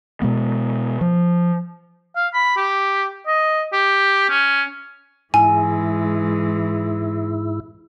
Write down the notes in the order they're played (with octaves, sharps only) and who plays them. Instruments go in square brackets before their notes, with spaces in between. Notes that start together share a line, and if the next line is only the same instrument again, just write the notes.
[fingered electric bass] B2 G#3 B3
F3
[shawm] F5
B5
G4
D#5
G4
C#4
[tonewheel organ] G#2 E4 [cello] E3 G#3 [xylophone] G#5